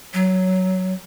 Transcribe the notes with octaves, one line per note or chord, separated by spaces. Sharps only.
F#3